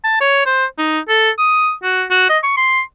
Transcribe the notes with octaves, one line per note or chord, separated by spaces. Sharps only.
A5
C#5
C5
D#4
A4
D#6
F#4
F#4
D#5
C#6
C6